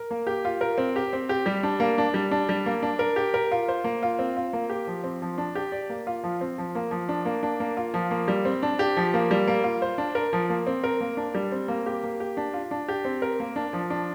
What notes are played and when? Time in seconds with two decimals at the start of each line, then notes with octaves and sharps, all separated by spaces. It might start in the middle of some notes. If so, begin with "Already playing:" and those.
Already playing: A#4
0.11 A#3
0.27 G4
0.45 F4
0.61 A#4
0.78 C4
0.96 G4
1.13 C4
1.29 G4
1.46 G3
1.63 D4
1.80 A#3
1.98 D4
2.14 G3
2.31 D4
2.49 G3
2.66 A#3
2.82 D4
2.99 A#4
3.16 G4
3.34 A#4
3.51 F4
3.68 C5
3.84 A#3
4.03 F4
4.19 C4
4.37 F4
4.53 A#3
4.70 G4
4.87 F3
5.04 C4
5.22 F3
5.38 D4
5.55 G4
5.72 D5
5.89 A#3
6.07 F4
6.24 F3
6.41 C4
6.58 F3
6.75 A#3
6.91 F3
7.09 D4
7.25 A#3
7.43 D4
7.60 A#3
7.77 F4
7.94 F3
8.11 A#3
8.28 G3
8.45 C4
8.63 D4
8.79 G4
8.97 F3
9.14 A#3
9.31 G3
9.47 A#3
9.64 F4
9.82 C5
9.98 D4
10.15 A#4
10.33 F3
10.50 A#3
10.67 C4
10.84 A#4
11.01 A#3
11.17 D4
11.35 G3
11.52 C4
11.68 A#3
11.86 G4
12.03 A#3
12.20 G4
12.37 D4
12.54 F4
12.71 D4
12.88 G4
13.05 C4
13.22 A#4
13.40 A#3
13.56 D4
13.73 F3
13.90 D4